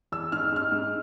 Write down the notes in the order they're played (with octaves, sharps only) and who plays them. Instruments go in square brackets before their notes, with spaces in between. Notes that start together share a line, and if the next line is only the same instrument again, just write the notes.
[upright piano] E2 E6
G#2 F6
G#2 F6
G#2